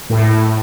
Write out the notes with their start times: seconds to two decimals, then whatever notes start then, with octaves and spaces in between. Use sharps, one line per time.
0.09 A2